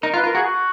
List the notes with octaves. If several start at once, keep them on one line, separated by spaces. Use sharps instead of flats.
D#4 A#4
F4 B4
F4 A#4
F#4 G#4
F#4